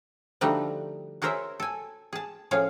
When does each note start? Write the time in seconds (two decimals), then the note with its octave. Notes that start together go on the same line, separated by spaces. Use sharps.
0.41 D3 F3 G3 A3 D#4 F#4
1.22 F#4 G#4 A#4 C5 C#5 E5
1.60 A4 G#5
2.13 G#4 A5
2.51 A2 F3 C#4 G#4 C#5 F5